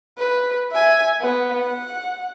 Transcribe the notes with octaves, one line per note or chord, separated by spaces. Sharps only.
B4
E5 G#5
B3
F#5